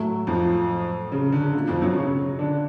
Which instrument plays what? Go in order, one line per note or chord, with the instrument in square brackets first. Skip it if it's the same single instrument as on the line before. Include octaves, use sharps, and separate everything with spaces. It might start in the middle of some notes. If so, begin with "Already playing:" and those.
Already playing: [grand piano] A2 F#3 A3
[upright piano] F2 F3
C#3
D3
[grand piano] B2 A3 F4 [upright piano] D3
[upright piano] F2 F3
F#2 F#3
C#3 C#4
D3 D4